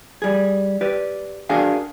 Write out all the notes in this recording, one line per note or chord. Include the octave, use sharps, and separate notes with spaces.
G3 G#4
G4 B4 D5
D4 F#4 G#4 A#4 F5